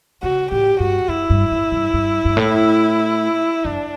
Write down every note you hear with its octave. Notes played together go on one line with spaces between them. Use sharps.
C#3 F#4
A2 G4
G2 F#4
F#2 E4
G2
A2
G2
G2
G2
A2
F#2 D4